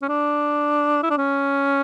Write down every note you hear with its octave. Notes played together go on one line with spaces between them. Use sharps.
C#4
D4
E4
D4
C#4